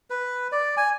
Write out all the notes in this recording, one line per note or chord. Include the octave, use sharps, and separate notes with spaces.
B4
D5
G#5